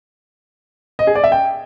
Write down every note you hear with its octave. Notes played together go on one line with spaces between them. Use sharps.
D#5
G#4
D5
E5
G5